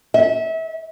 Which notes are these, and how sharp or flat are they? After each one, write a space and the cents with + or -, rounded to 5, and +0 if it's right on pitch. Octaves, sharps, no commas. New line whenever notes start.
E5 -30